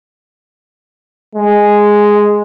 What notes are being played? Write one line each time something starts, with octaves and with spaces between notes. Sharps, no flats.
G#3